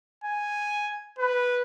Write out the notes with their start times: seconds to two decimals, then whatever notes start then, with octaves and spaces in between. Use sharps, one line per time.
0.24 G#5
1.19 B4